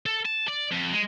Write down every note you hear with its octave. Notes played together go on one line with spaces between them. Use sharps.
A4
A5
D5
F2
G#3